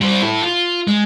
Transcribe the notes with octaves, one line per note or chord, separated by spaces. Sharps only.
G3 C5
E4 A4
F4
G#3